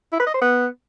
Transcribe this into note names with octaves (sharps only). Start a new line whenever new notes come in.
E4
B4
D#5
C5
B3